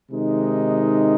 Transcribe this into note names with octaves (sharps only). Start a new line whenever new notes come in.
C3 D#3 G#3 D#4